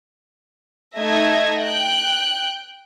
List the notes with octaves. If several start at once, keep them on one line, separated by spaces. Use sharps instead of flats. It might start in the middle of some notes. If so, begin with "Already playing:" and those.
A3 D#4 D#5 E5 G#6 A#6
G5 F#6